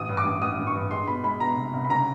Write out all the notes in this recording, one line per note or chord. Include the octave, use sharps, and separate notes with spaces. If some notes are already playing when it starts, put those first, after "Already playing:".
Already playing: A1 D#6
G2
D6
A1
A1 D#6
A1
C#6
G2
G#3 C6
B2 B5
G#3 B5
B2 A#5
C2
C2
B5
C#3 A#5